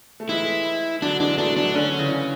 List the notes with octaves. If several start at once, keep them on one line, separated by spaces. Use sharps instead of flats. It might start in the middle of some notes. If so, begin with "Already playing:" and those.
A3
E3 G#3 E4
D3 F#3 D4
E3 G#3 D4
F#3 A3 D4
F#3 A3 D4
D3 F#3 C#4
C#3 E3